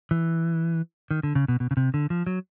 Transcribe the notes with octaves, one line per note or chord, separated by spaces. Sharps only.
E3
D#3
D3
C#3
B2
B2
C#3
C3
D3
F3
F#3